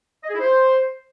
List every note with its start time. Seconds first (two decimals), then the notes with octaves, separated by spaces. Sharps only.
0.24 D#5
0.29 G#4
0.35 E4
0.40 C5